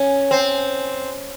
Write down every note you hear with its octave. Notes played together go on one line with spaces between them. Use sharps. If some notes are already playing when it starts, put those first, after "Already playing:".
Already playing: C#4
C4